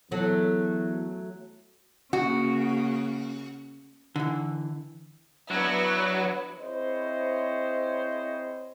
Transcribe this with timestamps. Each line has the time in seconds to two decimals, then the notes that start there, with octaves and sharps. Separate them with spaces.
0.11 E2 F#3 A3
2.13 C#3 A#3 F#4
4.16 D3 E3
5.51 F#3 B3 D4 E4
6.59 C4 E4 G#4 C5 C#5 D#5